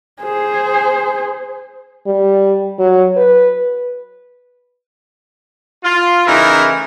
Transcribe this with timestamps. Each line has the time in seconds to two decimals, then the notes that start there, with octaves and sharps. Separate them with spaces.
0.21 G#4 C5
2.06 G3
2.79 F#3
3.17 B4
5.83 F4
6.26 C#3 E3 A3 D#4 E4 A#4